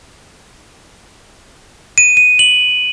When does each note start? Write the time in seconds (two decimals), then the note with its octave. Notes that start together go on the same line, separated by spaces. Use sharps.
1.98 D#7
2.17 D#7
2.39 F#7